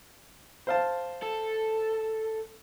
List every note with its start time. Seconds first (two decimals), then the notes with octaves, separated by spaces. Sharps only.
0.67 C5 F5 A5
1.23 A4